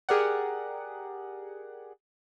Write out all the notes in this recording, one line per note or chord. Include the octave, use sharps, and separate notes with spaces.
G4 G#4 A#4 D5 F#5